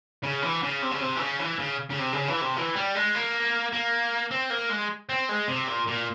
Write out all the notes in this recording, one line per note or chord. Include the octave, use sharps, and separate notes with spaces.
C#3
E3
C#3
C3
C#3
C3
E3
C#3
E3
C#3
C#3
C3
C#3
E3
C3
E3
G3
G#3
A#3
A#3
C4
A#3
G#3
C4
G#3
C3
A#2
A#2